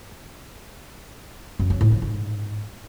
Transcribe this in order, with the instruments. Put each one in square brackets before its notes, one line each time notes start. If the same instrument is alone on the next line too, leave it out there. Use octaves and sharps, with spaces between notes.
[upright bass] F#2
F#3
A2
F3
G#2